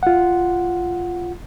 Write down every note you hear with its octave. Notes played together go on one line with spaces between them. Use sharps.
F4 F#5